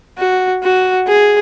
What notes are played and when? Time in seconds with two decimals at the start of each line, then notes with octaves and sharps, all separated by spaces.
0.18 F#4
0.63 F#4
1.07 G#4